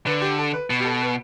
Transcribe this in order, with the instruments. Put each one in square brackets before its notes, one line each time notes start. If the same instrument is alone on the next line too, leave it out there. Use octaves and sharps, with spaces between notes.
[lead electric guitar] D3 [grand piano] B4
[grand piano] G4
A4
B4
[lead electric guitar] B2
[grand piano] G4
A4
B4